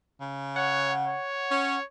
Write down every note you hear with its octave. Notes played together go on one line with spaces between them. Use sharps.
C#3
C#5 F#5
C#5
C#4